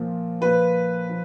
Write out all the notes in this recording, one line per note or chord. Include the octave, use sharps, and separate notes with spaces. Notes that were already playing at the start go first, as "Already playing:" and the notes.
Already playing: A#2 F3
A#2 F3 B4
F3